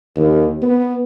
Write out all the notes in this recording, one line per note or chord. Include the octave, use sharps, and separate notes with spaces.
D#2
B3